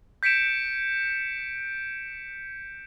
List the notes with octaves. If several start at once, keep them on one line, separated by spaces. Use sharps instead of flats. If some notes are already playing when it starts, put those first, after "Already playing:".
G6 B6 C#7 D7 E7